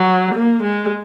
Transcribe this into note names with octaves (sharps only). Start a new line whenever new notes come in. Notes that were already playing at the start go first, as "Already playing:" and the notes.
Already playing: F#3
A#3
G#3